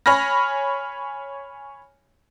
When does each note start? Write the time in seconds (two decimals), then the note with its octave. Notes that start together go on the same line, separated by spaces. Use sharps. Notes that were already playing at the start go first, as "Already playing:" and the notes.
0.06 C#5 G#5 B5 F6 A#6